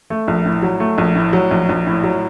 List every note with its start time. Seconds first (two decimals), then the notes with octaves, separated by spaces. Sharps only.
0.10 A3
0.28 A#1
0.46 A2
0.63 F#3
0.80 A3
0.98 A#1
1.15 A2
1.33 F#3
1.51 A#1
1.69 A#1
1.87 A2
2.04 F#3